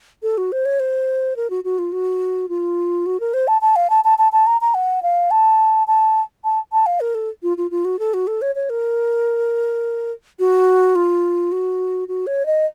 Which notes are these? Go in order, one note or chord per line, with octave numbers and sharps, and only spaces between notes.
A4
F#4
C5
C#5
C5
A#4
F#4
F#4
F4
F#4
F4
F#4
A#4
C5
A5
A5
F5
A5
A5
A5
A5
A#5
A#5
F#5
F5
A5
A5
A5
A5
F5
A#4
A4
F4
F4
F4
F#4
A4
F#4
A4
C#5
C#5
A#4
F#4
F4
F#4
F#4
C#5
D#5